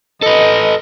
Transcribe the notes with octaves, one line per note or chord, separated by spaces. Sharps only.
A4 B4 D#5